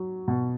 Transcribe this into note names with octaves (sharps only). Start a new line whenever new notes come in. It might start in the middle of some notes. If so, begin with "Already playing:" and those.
Already playing: F#3
B2